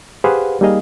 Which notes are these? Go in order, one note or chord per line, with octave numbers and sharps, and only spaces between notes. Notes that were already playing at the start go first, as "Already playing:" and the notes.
G4 G#4 B4 C5 F5 F#5
G3 A#3 D#4 G#4 D#5 F5